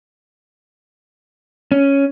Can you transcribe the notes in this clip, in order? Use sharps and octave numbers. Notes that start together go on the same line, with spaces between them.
C#4